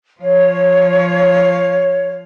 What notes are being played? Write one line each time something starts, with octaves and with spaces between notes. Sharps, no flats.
F3 C#5 F5